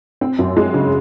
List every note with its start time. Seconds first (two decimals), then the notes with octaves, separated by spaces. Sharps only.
0.21 C4
0.39 F#2
0.57 G#3
0.74 C#3